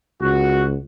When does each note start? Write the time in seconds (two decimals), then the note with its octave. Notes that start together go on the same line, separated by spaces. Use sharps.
0.21 C#2 F#4